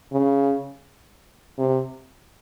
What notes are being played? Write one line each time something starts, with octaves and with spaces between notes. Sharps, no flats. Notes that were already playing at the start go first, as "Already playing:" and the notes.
C#3
C3